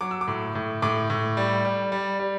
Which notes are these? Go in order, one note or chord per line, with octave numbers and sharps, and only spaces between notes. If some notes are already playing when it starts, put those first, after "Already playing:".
F#3 D6
E6
D6
A2
A2
A2 D6
A2
G3
G3
G3
G3